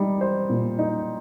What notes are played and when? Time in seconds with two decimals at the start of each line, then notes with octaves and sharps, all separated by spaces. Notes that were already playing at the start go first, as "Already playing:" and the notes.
Already playing: G3 D#4
0.21 C5
0.49 A#2
0.79 D#4